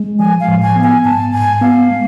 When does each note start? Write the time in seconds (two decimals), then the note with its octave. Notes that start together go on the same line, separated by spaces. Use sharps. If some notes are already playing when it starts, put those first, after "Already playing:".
Already playing: G#3
0.19 F3 G#5
0.40 F5
0.48 A2
0.62 G#5
0.76 B3
0.83 G#5
1.05 G#2 A5
1.33 G#2 G#5
1.62 B3 F5
1.91 G#3